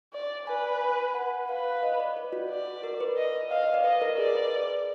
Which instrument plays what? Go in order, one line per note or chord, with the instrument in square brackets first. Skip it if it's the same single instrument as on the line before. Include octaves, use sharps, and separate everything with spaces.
[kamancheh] D5
[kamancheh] B4 [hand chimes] G#5
[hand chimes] G#5
F#5
[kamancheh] B4 [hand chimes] F5
[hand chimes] D#5
D5
B4
F#4
[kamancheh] D5
[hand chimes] A#4
B4
[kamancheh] D#5
[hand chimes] D#5 [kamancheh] F5
[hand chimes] D#5
D5
[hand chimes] B4 [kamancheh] D#5
[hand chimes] A#4
[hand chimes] G#4 [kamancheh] D5
[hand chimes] B4